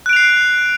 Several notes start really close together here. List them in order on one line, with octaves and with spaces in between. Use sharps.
F#6 D7 F7 C7